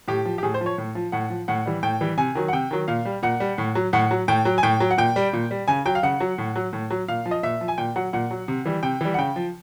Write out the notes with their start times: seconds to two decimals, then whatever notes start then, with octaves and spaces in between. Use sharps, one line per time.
0.08 A2 G4
0.25 F3
0.38 G4
0.43 A2 G#4
0.54 C5
0.61 F3
0.66 C#5
0.78 A2
0.95 F3
1.12 A2 F#5
1.30 F3
1.48 A2 F#5
1.66 E3 G3
1.83 A2 G5
2.01 E3 G3
2.18 C3 G#5
2.35 D#3 F#3
2.48 F#5
2.53 C3 G5
2.71 D#3 F#3
2.88 A#2 F5
3.05 G3
3.23 A#2 F#5
3.40 G3
3.58 A2
3.75 F#3
3.93 A2 F#5
4.11 F#3
4.28 A2 G5
4.45 F#3
4.58 G#5
4.63 A2 G5
4.80 F#3
4.91 F#5
4.98 A#2 G5
5.16 G3
5.33 A#2
5.51 G3
5.68 C#3 G#5
5.86 F#3 G5
5.95 F5
6.03 C#3 F#5
6.20 F#3
6.38 A2
6.56 F#3
6.73 A2
6.91 F#3
7.08 A#2 F5
7.26 F3
7.31 D#5
7.43 A#2 E5
7.61 F3
7.68 G#5
7.78 A#2 G5
7.96 F#3 F#5
8.13 A#2 F#5
8.31 F#3
8.48 C3
8.66 E3 G3
8.83 C3 G5
9.01 E3 G3
9.14 F#5
9.18 C#3 G5
9.36 F3